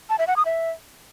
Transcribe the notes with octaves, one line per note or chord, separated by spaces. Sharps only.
A5
E5
F#5
D#6
E5